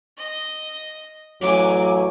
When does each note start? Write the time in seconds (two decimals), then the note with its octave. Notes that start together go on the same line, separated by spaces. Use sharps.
0.17 D#5
1.41 A1 F#3 G#5 D6